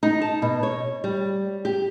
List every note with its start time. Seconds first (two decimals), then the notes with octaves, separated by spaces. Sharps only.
0.03 D#4
0.22 A5
0.42 B2
0.63 C#5
1.04 G3
1.65 G4